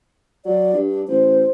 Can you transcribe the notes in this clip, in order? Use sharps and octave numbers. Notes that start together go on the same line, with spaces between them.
F#3 D5
G2
D4
A1 C5